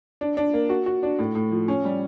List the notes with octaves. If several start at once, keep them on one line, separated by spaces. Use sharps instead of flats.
D4
D4
A#3
F#4
F#4
D4
A2
A2
F3
C#4
G3